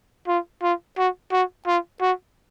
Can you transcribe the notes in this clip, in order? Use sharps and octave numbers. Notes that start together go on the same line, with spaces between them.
F4
F4
F#4
F#4
F4
F#4